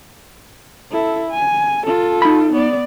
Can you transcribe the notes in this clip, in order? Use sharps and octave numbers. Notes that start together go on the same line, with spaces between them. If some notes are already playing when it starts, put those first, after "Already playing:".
E4 A4
G#5
F4 A4
D#4 B5
B3 D5